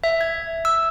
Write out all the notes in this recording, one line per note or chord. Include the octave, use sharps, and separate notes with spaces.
E5
G#6
E6